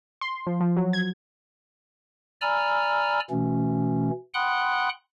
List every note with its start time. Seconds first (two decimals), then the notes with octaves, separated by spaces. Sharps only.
0.21 C6
0.47 F3
0.60 F3
0.77 F#3
0.93 G#6
2.41 D5 G#5 A#5 B5 E6 F6
3.30 B2 E3 A3 C#4
4.34 F#5 G5 B5 C6 D#6 F#6